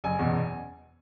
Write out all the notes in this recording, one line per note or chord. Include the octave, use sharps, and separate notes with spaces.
F#1 G#5
E2 B2